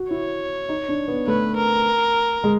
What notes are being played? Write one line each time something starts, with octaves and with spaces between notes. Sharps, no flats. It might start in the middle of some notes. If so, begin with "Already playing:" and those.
Already playing: F#4
E4 C#5
D#4
D4
B3
A3 B4
A#4
G#3